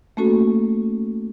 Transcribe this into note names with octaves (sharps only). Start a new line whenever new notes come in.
A3 A#3 C#4 F#4 A4